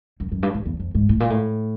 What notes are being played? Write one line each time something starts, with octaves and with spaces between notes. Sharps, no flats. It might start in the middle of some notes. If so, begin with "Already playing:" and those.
F#2
F#2
G2
G#2
E2
F2
G#2
A2
A#2
A2